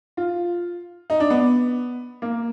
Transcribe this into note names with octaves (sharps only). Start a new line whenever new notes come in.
F4
D#4
D4
B3
A#3